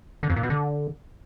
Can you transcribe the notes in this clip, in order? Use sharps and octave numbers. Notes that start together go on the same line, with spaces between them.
D3
F2
A#2
B2
D3